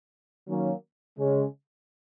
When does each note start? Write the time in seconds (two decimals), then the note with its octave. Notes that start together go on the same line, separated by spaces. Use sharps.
0.47 D#3 F#3 A#3 C#4
1.18 C#3 G#3 C#4